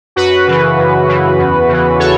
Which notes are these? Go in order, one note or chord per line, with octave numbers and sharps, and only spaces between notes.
F#2 F#4 B4
C#3 E3
F#2
C#3 E3
E2
C#3 E3
A4 C#5